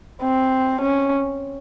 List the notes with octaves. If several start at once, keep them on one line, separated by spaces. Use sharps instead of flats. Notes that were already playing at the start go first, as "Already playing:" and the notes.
C4
C#4